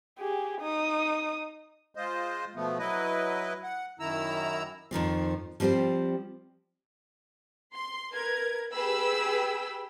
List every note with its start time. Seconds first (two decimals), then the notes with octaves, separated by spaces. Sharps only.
0.19 G4 G#4
0.61 D#4 D#6
1.95 G#3 F4 C5 D#5
2.55 B2 F3 A3 B3
2.79 F#3 E4 B4 D#5
3.63 F#5
3.99 F#2 D#3 E4 A#5 E6
4.91 F2 D#3 F3 C4
5.60 F3 G3 C4 G4 C5
7.73 C6
8.12 A#4 B4 G#6
8.73 G4 G#4 B4 G5 B5 E6